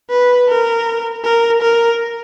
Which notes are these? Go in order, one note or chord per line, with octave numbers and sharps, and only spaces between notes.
B4
A#4
A#4
A#4